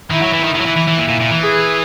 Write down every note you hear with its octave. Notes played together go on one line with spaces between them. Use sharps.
D#3 E4
F#3
E3
D#3
D#3 E4
F#3
E3
E3
E3
A#2
A#2
A#2
E3
G#4